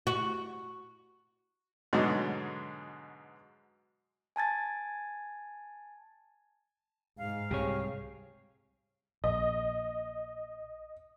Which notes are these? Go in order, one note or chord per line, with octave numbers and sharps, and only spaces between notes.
F#4
G#2 B2 D3 F#3 G#3
G#5 A5 G#6 A6
G#2 F5
C2 G4 G#4 C#5
A#1 D#5